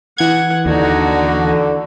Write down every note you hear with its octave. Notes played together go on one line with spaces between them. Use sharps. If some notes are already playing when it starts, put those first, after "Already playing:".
E3 F#5 G#6
D#2 D3 D#4 F#4